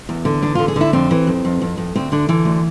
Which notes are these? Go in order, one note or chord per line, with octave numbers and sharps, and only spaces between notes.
E2
D3
E2 D4
D3 F4
G#4
D3 E4
F2 C4
E3
F2
F2
F2
F2
D2 C4
D3 D4
D3 E3
D2